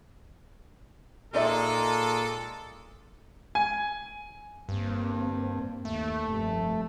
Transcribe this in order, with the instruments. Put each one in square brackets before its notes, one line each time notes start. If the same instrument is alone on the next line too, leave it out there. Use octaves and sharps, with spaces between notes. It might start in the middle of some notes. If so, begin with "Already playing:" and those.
[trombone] A#2 [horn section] G#3 A4 [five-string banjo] D#4 D5 E5
[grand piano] G#5
[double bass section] G1 A#3 C4 [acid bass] G2
[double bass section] D#2 [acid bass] A3
[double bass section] F1 G2